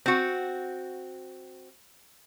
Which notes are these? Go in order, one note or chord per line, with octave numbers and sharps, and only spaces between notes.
C4 F#4